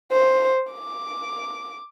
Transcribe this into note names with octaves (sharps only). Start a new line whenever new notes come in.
C5
D6